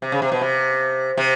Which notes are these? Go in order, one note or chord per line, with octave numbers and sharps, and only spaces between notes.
C3
C#3
C3
B2
C3
C3